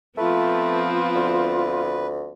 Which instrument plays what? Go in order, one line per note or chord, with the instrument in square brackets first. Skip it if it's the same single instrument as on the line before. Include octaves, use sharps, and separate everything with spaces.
[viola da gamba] F3 B3 C4 [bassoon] A3 [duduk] F4 [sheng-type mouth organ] B4
[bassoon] D2